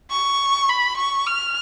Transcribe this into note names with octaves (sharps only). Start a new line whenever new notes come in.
C#6
B5
C#6
F6